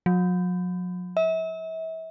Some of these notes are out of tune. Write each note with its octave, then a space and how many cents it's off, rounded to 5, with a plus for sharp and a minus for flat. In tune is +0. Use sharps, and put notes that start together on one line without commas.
F#3 -45
E5 -35